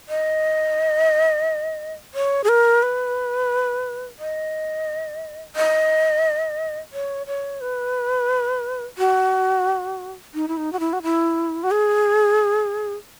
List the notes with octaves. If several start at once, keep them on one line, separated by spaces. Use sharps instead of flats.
D#5
C#5
G#4
A#4
B4
D#5
D#5
C#5
C#5
B4
F#4
D#4
E4
D#4
F#4
E4
F#4
E4
F#4
G#4